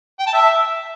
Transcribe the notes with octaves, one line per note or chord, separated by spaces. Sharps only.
G5
A5
E5